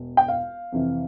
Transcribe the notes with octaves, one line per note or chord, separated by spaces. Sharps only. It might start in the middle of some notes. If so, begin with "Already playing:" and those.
Already playing: E1 E2
G5
F5
F2 C3 E3